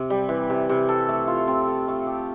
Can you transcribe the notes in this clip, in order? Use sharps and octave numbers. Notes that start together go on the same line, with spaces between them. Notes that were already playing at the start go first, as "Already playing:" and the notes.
Already playing: C3
G3
E3
C3
C3
A4
A3
F4
C4
A4
A3
G4